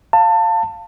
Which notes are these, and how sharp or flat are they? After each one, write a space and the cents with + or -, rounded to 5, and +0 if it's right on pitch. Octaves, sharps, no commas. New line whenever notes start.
F5 +0 A5 +25